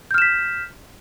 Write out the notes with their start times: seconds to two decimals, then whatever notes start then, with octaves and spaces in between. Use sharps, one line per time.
0.11 G6
0.14 F6
0.18 E7
0.22 B6